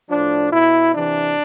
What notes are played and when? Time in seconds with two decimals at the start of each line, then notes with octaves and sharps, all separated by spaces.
0.10 A2 F3 D4
0.51 B2 E4
0.93 C3 E3 D4